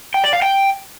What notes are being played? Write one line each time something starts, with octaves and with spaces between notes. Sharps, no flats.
G5
D5
F5
G5